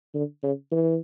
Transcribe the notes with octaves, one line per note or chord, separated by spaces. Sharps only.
D3
C#3
E3